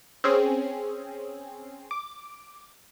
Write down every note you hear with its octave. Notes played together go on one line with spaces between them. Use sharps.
C4 C#4 G#4
D6